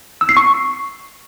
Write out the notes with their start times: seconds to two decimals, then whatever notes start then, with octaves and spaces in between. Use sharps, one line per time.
0.21 E6
0.29 C7
0.37 C#6